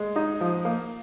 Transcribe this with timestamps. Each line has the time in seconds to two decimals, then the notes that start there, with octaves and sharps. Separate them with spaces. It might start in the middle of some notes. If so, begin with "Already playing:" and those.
Already playing: G#3
0.16 D#4
0.41 F3
0.65 A#3